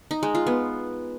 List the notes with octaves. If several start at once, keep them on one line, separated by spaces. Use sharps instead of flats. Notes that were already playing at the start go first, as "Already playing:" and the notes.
D#4
G#3
F4
B3